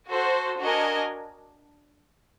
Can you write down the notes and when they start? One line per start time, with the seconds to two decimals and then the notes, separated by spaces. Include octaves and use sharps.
0.10 F#4 A4 C5
0.60 D4 F#4 A#4 D#5 G#5